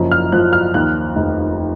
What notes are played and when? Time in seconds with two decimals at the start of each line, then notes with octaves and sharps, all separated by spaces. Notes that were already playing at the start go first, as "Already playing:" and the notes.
Already playing: F#1 F#2 F3
0.11 F6
0.32 F3 F#6
0.53 F6
0.74 D#2 F#6
1.16 F1